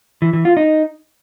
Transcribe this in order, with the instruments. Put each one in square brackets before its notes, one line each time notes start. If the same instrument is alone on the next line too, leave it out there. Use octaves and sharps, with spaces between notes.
[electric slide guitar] E3
E3
F4
D#4